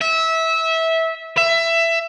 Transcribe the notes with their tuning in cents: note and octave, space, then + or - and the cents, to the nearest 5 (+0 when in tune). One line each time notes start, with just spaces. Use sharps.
E5 -20
E5 +15